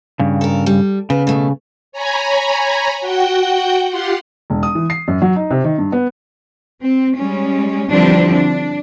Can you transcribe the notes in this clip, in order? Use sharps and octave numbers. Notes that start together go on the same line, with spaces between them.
G2 C#3
A4 A#4
G3
C#3 B3
B2 A3
C#5 G#5 A#5 B5
F#4 F#5 G5 G6
F4 G4 F#5 C6
E1
D#6
E3
C7
F#2
F#3
D#4
C3
D#3
G2
B3
C4
G3 G#3 C#4
D3 E3 F3 G3 C4 D4
D4